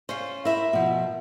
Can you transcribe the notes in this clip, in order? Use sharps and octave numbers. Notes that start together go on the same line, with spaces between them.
C#4 F4 C5
E4 A#4 E5
B2 F3